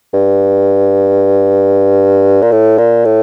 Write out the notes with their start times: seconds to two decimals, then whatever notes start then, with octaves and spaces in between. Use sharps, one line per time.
0.14 G2
2.42 A#2
2.52 A2
2.78 A#2
3.05 A2